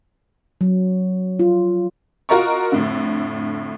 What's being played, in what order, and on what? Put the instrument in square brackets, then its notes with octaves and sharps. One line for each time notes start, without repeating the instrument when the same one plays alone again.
[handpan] F#3
F4
[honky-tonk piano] F4 F#4 A#4 D#5 A#5 C#6
F2 A2 D3